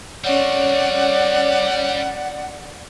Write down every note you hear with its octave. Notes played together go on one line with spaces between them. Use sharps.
G3 C4 C#4 C#5 D5 F#5